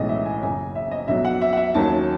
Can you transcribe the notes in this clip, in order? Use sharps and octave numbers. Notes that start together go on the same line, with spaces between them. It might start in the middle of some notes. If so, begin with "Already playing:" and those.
Already playing: B1 A2 E3 G#3 C#4 D#5
E5
G#5
F#1 F#2 C#3 G#5
E5
D#5
B1 B2 F#3 E5
F#5
E5
F#5
E5
D#2 D#3 F#3 C#4 A5